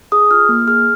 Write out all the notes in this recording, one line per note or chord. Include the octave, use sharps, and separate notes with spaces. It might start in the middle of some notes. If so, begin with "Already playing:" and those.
G#4 D#6
F4 F6
A#3
G#4 F6